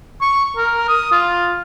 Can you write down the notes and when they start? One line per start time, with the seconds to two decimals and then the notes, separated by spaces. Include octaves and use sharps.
0.21 C#6
0.57 A#4
0.88 D#6
1.12 F4